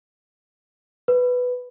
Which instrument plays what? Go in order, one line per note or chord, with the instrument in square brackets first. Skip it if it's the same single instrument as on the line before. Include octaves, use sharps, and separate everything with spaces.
[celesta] B4